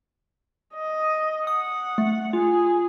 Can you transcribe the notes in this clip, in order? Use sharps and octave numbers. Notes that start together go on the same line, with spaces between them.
D#5
F#5 D#6
A3
F4 G#4